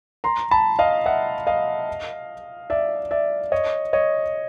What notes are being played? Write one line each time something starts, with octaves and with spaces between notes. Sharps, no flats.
A#5 C6
A5 B5
D#5 F5
E5 F#5
D#5 F5
D5 E5
D5 E5
C#5 D#5
C#5 D#5